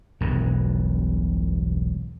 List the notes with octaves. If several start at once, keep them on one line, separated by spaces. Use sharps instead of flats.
E1 B1 G2